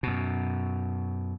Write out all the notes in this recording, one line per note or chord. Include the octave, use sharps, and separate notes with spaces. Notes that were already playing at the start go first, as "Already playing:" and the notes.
F#2 B2